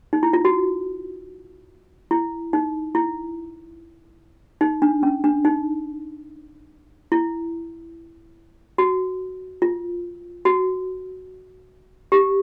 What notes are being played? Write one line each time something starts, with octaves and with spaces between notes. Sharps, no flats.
D#4
E4
F4
F#4
E4
D#4
E4
D#4
D4
C#4
D4
D#4
E4
F#4
F4
F#4
G4